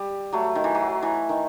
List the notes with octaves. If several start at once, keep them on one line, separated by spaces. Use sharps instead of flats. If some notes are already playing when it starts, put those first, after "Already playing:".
Already playing: G3
F#3 A3
D#3
E3
F#3
E3
D#3